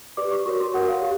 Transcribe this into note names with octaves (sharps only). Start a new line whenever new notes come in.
G4 B4 D5 D6
C#6
F#4 A#4 C#5 C#6
C6
F#4 A#4 C#5 F#5
F5
G4